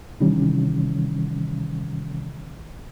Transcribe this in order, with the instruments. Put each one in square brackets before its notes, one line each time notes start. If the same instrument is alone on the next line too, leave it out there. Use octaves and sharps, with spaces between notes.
[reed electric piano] C3 D#3 E3 G3 C#4